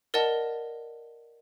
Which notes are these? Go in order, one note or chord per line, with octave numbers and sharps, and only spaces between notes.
A#4 D5 D#5 F#5 A5